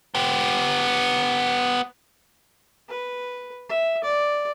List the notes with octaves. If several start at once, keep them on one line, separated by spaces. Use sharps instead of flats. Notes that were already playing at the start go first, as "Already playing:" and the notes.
B3 G4
B4
E5
D5